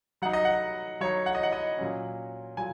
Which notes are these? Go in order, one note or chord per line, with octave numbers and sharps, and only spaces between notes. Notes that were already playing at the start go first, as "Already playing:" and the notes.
F#3 D#4 F#5
D#5
F#5
F#3 D#4 C#5
F#5
D#5
F#5
D#5
A#2 F#3 C#4
A#2 F#3 G#5